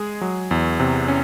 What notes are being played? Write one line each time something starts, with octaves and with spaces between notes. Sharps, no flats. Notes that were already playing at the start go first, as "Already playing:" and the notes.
Already playing: G#3 G#4
F#3
E2
C3
C#4